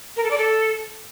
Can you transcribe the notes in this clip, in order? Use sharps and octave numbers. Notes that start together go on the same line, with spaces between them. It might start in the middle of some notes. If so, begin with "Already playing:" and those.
A#4
A4
D5
A4